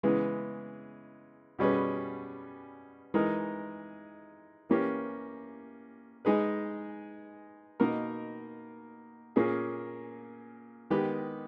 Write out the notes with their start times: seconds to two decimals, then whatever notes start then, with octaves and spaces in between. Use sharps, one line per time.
0.03 C#3 E3 G#3 B3
1.59 B2 G3 C#4 G#4 B4
3.14 E3 G#3 D#4 A#4
4.69 E3 A#3 C#4 G4
6.25 G#3 D#4 G#4 B4
7.80 B2 A#3 D#4 A#4
9.36 A#2 A#3 C#4 G#4
10.90 D#3 G#3 B3 G4 B4